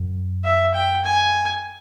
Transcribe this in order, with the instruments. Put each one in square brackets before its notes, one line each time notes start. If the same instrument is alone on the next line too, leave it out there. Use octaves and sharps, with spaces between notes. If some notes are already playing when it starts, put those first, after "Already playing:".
Already playing: [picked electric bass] F#2
[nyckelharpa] E5
G5
G#5